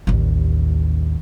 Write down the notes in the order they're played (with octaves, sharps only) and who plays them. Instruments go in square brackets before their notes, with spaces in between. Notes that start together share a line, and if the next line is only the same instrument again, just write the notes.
[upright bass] A1 D#2